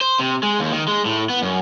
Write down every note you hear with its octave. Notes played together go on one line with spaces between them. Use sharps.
C5
C3
G#3
D#2
D#3
G#3
A2
B3
F#2